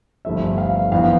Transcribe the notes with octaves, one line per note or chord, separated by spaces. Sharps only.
G1 G2 F3 A3 E5
F5
F2 E3 B3 F5